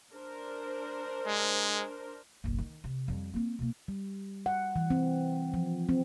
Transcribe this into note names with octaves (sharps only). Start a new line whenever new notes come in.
D4 A#4 C5
G#3
F#1 B1
D#3
C3
F2 G3
A#3 C4
B2 A#3
G3
F#5
E3
C4
F3
C4